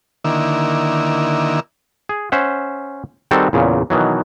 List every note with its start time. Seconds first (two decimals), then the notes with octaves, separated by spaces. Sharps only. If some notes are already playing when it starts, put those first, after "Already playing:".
0.24 D3 D#3 A#3 E4
2.09 G#4
2.32 C#4 C5 E5 F#5
3.31 D#3 G3 C4 F#4 A4
3.53 E2 A#2 C#3
3.90 B2 D#3 E3 F#3